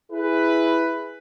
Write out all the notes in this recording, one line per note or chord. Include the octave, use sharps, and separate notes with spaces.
E4 G#4 B4